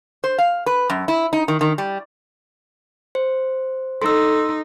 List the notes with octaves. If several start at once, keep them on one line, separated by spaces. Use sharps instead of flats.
C5
F5
B4
F#2
E4
D#4
D#3
D#3
G3
C5
D#4 A4 C6 E6